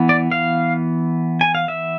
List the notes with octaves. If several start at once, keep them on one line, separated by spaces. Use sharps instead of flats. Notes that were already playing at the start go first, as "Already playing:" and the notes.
Already playing: E3 B3
D5
F5
G#5
F5
E5